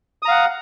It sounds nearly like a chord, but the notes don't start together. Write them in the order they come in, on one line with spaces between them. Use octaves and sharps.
D#6 A#5 F5 F#5